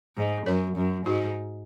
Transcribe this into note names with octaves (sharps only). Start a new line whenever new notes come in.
G#2
F#2 A#4 C#5
F#2
G#2 D#4 F#4